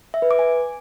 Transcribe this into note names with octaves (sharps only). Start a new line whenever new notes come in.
E5
B4
D6
G#5